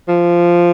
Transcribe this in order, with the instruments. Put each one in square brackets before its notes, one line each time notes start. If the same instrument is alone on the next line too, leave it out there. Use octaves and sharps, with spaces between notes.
[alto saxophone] F3